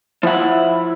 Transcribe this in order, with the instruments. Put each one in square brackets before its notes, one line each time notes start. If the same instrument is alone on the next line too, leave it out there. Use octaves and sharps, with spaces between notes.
[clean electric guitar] F3 F#5 [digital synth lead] E4